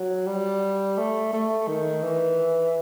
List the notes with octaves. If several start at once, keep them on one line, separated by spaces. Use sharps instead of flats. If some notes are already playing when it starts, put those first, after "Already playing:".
Already playing: F#3
G3
A3
A3
D#3
E3